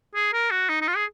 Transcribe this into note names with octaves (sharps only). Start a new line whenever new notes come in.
G#4
A#4
F#4
D#4
D#4
F4
G#4